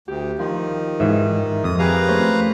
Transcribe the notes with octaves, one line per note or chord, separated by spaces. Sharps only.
D2 G4
D#3 F3
G#2 E3 E5
F2 D#6
G4 G#4 A#4 B4 F5 A#5
A3 C#4 C5